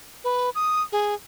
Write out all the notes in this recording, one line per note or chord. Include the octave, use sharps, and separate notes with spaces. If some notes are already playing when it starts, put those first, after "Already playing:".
B4
D#6
G#4